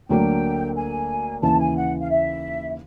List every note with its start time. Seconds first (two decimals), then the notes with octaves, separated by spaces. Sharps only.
0.08 D2 D3 F#3 A#3 D4 G5
0.75 G#5
1.42 D#2 C#3 E3 A5
1.58 G#5
1.76 F#5
2.01 F5
2.09 E5